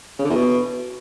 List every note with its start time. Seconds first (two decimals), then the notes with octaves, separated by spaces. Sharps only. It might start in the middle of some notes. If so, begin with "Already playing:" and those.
0.19 C#3
0.24 D3
0.30 E2
0.36 B2